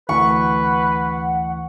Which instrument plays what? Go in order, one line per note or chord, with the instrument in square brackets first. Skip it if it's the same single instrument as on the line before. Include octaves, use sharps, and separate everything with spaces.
[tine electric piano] D2 E3 [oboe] B4 [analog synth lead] F#5 [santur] C#6